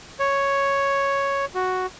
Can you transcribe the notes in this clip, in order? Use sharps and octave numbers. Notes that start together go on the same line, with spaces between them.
C#5
F#4